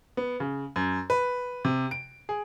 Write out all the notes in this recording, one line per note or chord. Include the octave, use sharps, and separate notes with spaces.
B3
C#3
F#2
B4
C3
D7
G#4